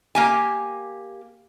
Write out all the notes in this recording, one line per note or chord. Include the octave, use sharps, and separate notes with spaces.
A#3 G4 G#5